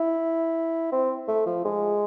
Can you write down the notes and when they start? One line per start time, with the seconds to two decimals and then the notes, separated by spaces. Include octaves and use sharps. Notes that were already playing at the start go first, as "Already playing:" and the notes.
Already playing: E4
0.92 C4
1.28 A3
1.46 F3
1.65 G#3